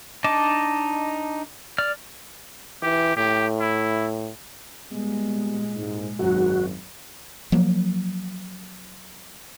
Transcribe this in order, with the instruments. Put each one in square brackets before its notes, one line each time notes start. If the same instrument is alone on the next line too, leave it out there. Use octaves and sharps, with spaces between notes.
[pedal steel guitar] D4 D#4 D#5 A5 D6
D5 F6
[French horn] E3 [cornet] G4
[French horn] A2 [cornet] G4
[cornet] E4
[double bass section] A#2 G#3 [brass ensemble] G3 B3
[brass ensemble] C2 G#2
[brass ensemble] G#1 [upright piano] F#2 F#3 [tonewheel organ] F#4
[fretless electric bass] F3 F#3 A#3